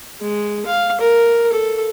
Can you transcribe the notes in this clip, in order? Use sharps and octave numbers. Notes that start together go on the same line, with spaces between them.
G#3
F5
A#4
A4